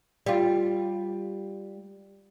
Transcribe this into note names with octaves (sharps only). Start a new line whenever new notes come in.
G3 F4